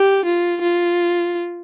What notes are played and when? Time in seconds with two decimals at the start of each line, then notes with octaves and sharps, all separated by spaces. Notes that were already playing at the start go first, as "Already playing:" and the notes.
Already playing: G4
0.25 F4
0.62 F4